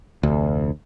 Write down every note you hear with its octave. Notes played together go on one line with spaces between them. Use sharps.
F1 D2